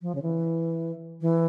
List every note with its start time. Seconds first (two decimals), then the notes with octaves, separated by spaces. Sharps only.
0.02 F3
0.15 C#3
0.22 E3
1.21 E3